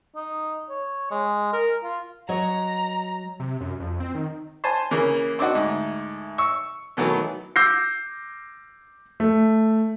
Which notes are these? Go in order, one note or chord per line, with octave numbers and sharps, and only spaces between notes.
D#4
C#5
G#3
A#4
F4
F#3 C#5 D#5 A#5
C3
F#2
F2
C4
D#3
C5 G#5 A5 C6
C#3 E3 A#3
C4 D4 D#4 F#4
D2 G#2
C#6 E6
B2 D#3 E3 F#3 A3 B3
D6 E6 G6 A#6 C7
A3